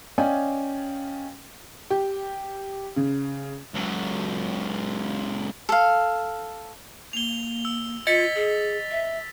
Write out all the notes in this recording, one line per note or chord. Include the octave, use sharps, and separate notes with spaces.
C#4 D5 D#5 F5 G5 G#5
G4
C#3
C#2 F#3
A4 F5
A#3 F7 G7
E6
F4 D#5 A6 B6 C#7
G#4
E5